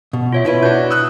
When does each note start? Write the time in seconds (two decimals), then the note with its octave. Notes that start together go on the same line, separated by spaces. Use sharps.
0.13 B2
0.33 F4 C#5 E5
0.45 B2 E4 B4
0.63 D4 F#4 G6
0.91 D#6 E6 F#6